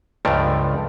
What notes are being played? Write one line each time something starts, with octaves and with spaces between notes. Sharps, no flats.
C#2 G2 F3 A3 D5 A#5